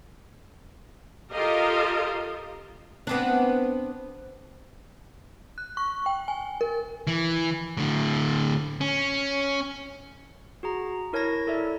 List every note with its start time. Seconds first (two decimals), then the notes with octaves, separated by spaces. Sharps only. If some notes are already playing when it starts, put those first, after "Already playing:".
1.31 F4 G4 A4 A#4 D#5 F5
3.07 B3 C4 D4
5.58 F#6
5.77 C#6
6.06 G5
6.28 G#5
6.61 A#4
7.07 E3
7.77 A2 D3
8.81 C#4
10.63 F#4 G#4 A#5
11.13 E4 A#4 C#5 A5 G#6 A#6
11.47 E4 A4 D5 E5